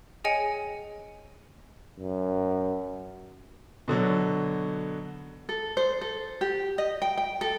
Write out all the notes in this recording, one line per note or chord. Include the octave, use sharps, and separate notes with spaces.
G#4 C#5 D#5 G5 G#5 C#7
F#2
B2 D3 F#3
A4
C5
A4
G4
D#5
G5
G5
A4